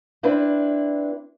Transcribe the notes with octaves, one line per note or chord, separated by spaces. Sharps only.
C4 D4 E4 B4